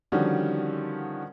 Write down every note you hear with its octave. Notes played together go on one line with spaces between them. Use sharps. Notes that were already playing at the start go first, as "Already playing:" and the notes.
D3 D#3 F3 G3 C#4 F#4